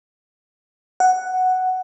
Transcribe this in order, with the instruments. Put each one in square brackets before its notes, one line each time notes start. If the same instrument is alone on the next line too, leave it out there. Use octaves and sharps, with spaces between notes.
[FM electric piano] F#5